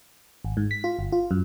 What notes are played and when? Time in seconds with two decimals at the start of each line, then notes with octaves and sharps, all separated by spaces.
0.45 G#1
0.57 G#2
0.71 B6
0.84 F4
0.99 G1
1.12 F4
1.31 F#2